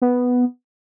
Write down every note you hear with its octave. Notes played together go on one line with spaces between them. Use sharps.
B3